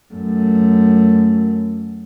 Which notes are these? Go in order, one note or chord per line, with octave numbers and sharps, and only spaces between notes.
F#2 A3